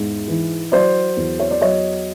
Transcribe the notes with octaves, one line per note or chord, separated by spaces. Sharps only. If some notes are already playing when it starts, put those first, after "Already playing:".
Already playing: E2 G#2
E3
F#3 C5 D5
E2
C#5
D5
F#3 C#5 D#5